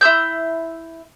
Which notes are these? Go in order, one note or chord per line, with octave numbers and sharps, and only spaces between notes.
E4 C6 E6 G6